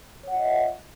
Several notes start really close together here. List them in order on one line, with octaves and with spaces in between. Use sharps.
C#5 F#5 F4 D#5 E5